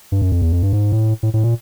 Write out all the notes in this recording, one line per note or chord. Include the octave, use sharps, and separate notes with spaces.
G2
F#2
F2
E2
F2
G2
G#2
A2
A2
A2
A#2